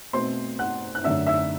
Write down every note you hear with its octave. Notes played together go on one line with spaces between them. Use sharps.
B2 A3 C4 C5 C6
F#5 F#6
F#6
F#2 D3 A3 D4 E5 E6
E5 E6